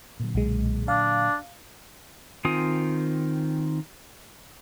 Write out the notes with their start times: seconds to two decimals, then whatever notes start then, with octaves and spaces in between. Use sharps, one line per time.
0.20 A#2 D3 F#3
0.35 B1 G#3
0.88 D4 F5
2.45 D#3 C4 F4 G#5 D#6